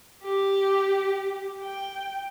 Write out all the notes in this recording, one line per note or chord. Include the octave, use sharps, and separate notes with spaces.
G4
G5